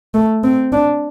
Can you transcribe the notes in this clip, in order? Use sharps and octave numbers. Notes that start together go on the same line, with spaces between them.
A3
C4
D4